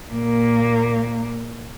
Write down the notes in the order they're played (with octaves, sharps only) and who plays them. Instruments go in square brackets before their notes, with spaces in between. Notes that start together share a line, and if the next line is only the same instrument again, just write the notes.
[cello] A#2 A#3